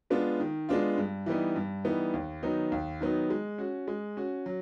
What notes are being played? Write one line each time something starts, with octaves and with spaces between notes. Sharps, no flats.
G#3 B3 D4 F4
D#3
G#3 B3 D4 F4
G2
E3 G3 B3 D#4
G2
E3 G3 B3 D#4
D#2
D#3 F#3 B3 D#4
D#2
D#3 F#3 B3 D#4
G#3
C#4 F#4
G#3
C#4 F#4
F#3